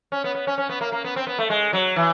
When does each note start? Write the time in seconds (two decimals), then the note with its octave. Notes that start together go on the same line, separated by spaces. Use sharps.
0.12 C#4
0.24 B3
0.35 B3
0.47 C#4
0.58 C#4
0.69 B3
0.81 A#3
0.92 A#3
1.04 B3
1.16 C4
1.27 B3
1.39 A3
1.50 G#3
1.73 F#3
1.96 E3